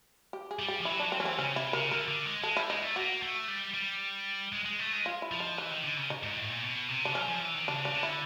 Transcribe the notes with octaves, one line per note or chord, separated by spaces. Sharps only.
G4
G#4
G3
G4
F3
F#3 E4
F#3 D4
C4
E3 C#4
C4
C#3 C#4
C3 E4
C#3 A#4
D3 A#4
D3
G#3
G#3 A4
G3 E4
G#3 D#4
A3
A#3 F#4
A3
G3
G3
G#3
G#3
A3
G#3
F4
E4
F3
D#4
E3 D#4
D#3
D3
C#3
D#4
G#2
A2
A#2
B2
C3
D4
F#3 C#4
F3
E3
D#3
C#3 D4
D4
D3
E4